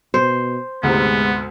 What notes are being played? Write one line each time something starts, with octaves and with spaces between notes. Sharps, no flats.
B2 C5
D2 G#2 C3 G#3 B3